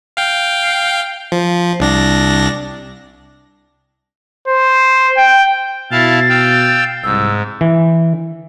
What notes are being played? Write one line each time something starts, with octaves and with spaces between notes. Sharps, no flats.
F5 G5
F3
C2 D4 A#6
C5
G5
B2 E4 F5 A5 A6
F5 G5 E6
C2 G#2 E6
E3